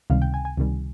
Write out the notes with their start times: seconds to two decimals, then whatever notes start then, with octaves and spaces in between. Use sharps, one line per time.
0.10 C#2 C3 D#3 G3 F5
0.22 G5
0.34 G#5
0.45 G#5
0.57 C#2 C3 D#3 G3